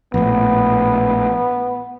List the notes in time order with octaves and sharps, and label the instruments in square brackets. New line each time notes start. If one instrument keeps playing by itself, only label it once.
[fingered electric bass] A#1 A2 [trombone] B3